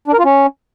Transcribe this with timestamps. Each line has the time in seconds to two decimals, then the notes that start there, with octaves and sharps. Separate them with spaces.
0.08 D4
0.13 A#4
0.19 F4
0.25 C#4